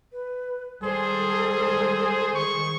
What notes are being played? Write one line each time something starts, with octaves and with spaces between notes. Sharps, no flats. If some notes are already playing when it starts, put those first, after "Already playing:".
B4
D#3 G3 G#3 G#4 A4 C5
D#3 G#4 C#6